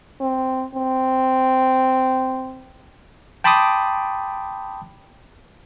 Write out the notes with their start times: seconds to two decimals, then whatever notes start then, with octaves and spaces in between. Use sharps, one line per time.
0.21 C4
0.75 C4
3.44 G5 A5 B5 C6 D6 D#6